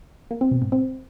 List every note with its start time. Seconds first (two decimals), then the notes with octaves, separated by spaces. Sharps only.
0.31 A#3
0.41 C4
0.51 B2
0.62 G#2
0.72 C4